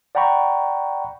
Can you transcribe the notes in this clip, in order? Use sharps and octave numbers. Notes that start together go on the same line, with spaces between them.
D5 F#5 G5 A#5 B5 C#6